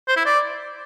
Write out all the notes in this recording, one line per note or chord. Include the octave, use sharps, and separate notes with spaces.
C5
E4
D5